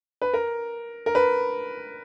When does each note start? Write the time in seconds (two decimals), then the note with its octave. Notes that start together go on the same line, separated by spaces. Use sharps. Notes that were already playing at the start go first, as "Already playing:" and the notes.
0.22 B4
0.34 A#4
1.06 A#4
1.15 B4